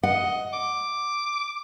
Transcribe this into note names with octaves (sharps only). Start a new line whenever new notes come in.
D#5 F#5
D6